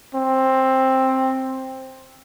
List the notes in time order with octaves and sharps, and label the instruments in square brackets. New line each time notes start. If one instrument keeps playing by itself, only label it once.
[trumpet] C4